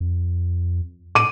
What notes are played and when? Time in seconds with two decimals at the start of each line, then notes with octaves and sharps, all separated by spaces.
0.01 F2
1.15 A2 D6 D#7